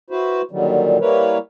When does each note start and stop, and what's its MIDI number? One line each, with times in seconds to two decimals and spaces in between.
0.10 0.42 64
0.10 0.42 66
0.10 0.42 71
0.10 0.42 72
0.51 0.98 46
0.51 0.98 50
0.51 0.98 51
0.51 0.98 54
0.51 0.98 55
1.01 1.38 55
1.01 1.38 58
1.01 1.38 64
1.01 1.38 70
1.01 1.38 71
1.01 1.38 73